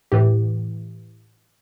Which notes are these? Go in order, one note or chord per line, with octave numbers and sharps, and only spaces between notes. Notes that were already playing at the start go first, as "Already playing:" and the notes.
A2 E3 G4